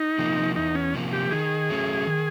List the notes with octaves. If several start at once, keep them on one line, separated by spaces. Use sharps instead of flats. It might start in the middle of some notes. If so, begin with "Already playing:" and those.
Already playing: D#4
C3 F3 A#3
E2 D#4
C#4
C3 F3 A#3
G4
D#3 G#4
F#3 A3 C#4
D#3